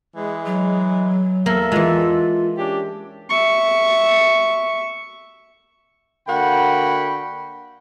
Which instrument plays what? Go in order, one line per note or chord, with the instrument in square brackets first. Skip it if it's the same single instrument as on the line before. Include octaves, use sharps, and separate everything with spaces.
[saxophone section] E3 G#3
[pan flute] F#3
[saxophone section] E2 A4 E5 [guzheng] A#3
[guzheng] E3 G#3 [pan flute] F4
[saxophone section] C#4 D4 G4
[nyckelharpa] E5 C#6
[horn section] D3 A#3 F#4 G5 B5